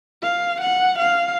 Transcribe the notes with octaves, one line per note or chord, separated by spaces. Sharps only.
F5
F#5
F5